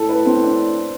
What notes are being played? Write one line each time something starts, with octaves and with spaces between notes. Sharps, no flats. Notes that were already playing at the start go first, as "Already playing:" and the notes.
Already playing: A2 A4
B4
C4
D4